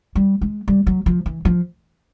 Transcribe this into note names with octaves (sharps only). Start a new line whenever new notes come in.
G3
G#3
G3
F#3
F3
E3
F3